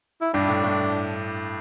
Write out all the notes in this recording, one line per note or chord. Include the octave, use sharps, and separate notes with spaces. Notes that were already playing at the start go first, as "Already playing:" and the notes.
E4
G2 D4
A2
A2